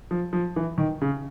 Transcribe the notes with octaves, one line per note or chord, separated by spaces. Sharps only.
F3
F3
E3
D#3
C#3